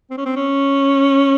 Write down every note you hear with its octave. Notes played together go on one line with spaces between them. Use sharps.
C4
C#4
C4
C#4